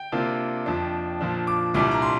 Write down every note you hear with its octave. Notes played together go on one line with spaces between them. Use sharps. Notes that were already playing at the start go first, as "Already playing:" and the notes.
Already playing: G5
C3 A#3 D4 F4
F2 F3 D4
A#2 F3 D4
D6
C2 A#2 G3 D4 D6
A#5
C6